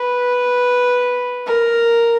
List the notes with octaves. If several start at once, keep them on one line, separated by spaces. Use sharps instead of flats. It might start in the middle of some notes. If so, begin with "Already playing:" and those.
Already playing: B4
A#4